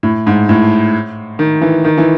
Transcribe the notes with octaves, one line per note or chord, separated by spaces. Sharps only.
A2
G#2
A2
D#3
E3
D#3
E3